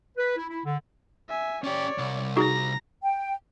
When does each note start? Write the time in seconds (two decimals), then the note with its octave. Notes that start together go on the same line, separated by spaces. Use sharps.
0.17 B4
0.37 E4
0.49 E4
0.65 D3
1.29 E5 G#5
1.64 C#4 G4 C#5 D5
1.98 C2
2.36 D#4 F#4 G#4 A#5 A#6
3.03 G5